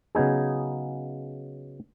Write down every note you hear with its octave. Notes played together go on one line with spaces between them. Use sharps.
C#3 F#3 B3 D#4 G#4